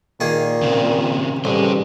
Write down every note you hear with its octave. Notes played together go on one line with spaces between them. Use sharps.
A#2 D#3 A#3 G#4
C#3 C4
A1 G3 G#4 C5